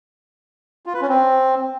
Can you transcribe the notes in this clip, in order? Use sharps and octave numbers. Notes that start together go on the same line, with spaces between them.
F4
B4
C#4
C4